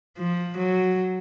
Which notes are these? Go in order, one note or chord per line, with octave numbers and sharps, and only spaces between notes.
F3
F#3